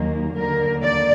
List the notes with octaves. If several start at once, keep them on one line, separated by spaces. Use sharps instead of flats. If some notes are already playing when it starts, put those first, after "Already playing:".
Already playing: D#2 D#3 F#3 A#3
D#2 D3 F#3 A#3 A#4
D5